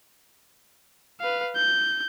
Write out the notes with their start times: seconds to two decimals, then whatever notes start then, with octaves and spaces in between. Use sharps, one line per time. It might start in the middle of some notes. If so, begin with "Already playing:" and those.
1.20 B4 F5
1.56 G6